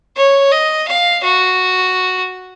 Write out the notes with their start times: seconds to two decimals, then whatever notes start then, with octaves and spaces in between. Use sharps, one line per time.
0.16 C#5
0.52 D#5
0.88 F5
1.24 F#4